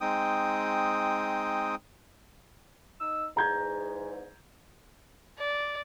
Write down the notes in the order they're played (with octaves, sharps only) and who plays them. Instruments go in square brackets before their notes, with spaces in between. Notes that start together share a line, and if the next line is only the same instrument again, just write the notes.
[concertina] G#3 C4 D#4 G5 D#6
[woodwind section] D#4 E6
[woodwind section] E2 G#2 [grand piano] A#5 G6 G#6
[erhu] D5